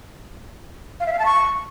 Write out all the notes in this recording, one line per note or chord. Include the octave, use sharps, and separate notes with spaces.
F5
E5
F5
A5
C#6